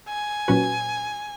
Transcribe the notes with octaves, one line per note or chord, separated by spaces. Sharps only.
G#5
A#2 F#3 C#4 F#4 B4